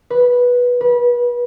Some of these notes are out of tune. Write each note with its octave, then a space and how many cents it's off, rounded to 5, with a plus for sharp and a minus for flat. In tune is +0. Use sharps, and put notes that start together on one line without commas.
B4 -10
B4 -30